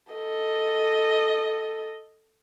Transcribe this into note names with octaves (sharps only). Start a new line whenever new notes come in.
A4 D#5